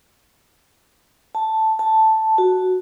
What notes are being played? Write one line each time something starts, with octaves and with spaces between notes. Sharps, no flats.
A5
A5
F#4